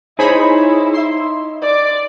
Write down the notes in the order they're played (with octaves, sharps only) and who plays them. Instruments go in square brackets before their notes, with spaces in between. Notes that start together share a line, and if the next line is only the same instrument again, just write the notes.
[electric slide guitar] D#4 C#5 [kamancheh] E4 [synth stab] G#4 C5 B5
[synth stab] E5 C6
[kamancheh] D5 D6